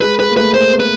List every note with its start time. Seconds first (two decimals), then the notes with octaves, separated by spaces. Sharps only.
0.01 G#3 B4
0.19 G#3 B4
0.29 A#3
0.37 A3 B4
0.54 A#3 C5
0.71 B3
0.80 B4